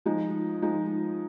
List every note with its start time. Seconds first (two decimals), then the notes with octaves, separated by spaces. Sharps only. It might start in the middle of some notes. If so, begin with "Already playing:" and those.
0.06 F3 G#3 D#4
0.62 F3 G#3 D#4